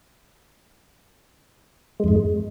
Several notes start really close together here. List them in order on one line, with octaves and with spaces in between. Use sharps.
G#3 F2 G#2